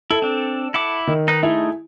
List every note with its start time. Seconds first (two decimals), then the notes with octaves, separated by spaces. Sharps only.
0.11 E4 A4
0.22 C4 D4
0.74 E4 F#5 D6
1.07 D#3
1.28 D#4 B4
1.43 A3 D#4 E4 G#4